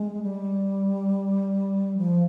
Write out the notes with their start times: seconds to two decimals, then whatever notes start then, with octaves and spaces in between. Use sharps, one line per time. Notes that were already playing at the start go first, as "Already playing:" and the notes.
Already playing: G#3
0.22 G3
1.98 F3